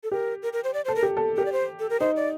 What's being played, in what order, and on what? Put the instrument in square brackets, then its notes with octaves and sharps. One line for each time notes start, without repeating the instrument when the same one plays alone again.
[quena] A4
[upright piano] G4 [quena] A#4
[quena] A#4
A#4
C5
D5
C5
[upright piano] A4
[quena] A#4
[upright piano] G4
A4
[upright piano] G4 [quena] A#4
[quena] D5
C5
A4
A#4
[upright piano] D#4 [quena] C5
[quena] D5